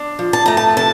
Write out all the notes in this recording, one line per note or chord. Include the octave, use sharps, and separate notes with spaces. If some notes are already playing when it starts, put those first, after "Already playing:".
Already playing: D4
F3
A5
A3 A#5
A5
C3 A5